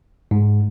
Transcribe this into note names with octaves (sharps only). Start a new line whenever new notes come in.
G#2